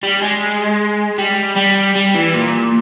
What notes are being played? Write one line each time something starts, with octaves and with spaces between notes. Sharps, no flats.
G3
G#3
G3
G3
G3
E3
A#2